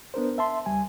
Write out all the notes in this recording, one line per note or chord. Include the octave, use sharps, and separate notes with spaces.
B3 D4 A#4 C5
E5 A5 C6
C#2 G3 G#5